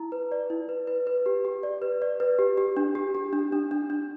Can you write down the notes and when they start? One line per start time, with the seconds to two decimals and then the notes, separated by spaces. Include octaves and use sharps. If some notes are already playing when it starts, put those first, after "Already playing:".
Already playing: E4 A#5
0.12 B4
0.32 D5
0.50 E4
0.69 B4
0.87 B4
1.07 B4
1.26 G4
1.45 G4
1.63 D5
1.82 B4
2.02 D5
2.20 B4
2.39 G4
2.58 G4
2.77 D4
2.95 G4
3.15 G4
3.33 D4
3.52 D4
3.71 D4
3.90 D4